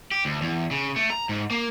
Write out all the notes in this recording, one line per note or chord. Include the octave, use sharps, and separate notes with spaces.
G4
D2
E2
C#3
A3
A#5
G#2
A#3